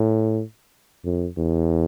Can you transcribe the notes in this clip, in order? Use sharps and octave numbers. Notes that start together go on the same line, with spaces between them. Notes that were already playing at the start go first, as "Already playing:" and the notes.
Already playing: A2
F2
E2